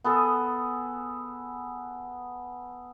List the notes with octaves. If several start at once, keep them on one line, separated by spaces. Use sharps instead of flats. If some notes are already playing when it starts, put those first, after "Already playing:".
B3 G#4 A4